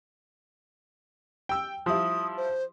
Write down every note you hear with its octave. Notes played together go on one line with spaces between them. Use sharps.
G5 E6
F3 G3 E4 D#6
C5